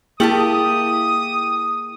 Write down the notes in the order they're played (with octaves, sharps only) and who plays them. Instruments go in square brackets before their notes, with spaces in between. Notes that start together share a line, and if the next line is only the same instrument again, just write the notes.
[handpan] A#3 [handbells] E4 G#4 [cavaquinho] G4 E5 A5 [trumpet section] D#6